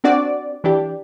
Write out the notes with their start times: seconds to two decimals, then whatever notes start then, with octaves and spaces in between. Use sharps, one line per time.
0.04 C4 D4 F#4 D5
0.64 E3 D4 G4